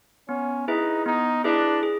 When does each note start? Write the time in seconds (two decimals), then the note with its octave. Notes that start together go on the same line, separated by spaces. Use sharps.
0.28 B3 C#4
0.68 D#4 E4 G#4 B4 E5
1.06 B3 D#4
1.44 D4 E4 G#4 B4 E5
1.83 G#4